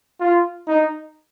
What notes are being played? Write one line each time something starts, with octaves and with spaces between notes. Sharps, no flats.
F4
D#4